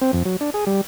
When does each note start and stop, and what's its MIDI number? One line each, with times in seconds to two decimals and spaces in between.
0.02 0.11 60
0.13 0.23 41
0.25 0.36 54
0.41 0.50 62
0.54 0.65 68
0.67 0.81 55